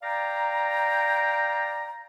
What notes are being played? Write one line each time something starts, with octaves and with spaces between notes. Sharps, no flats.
D5 F5 G5 A#5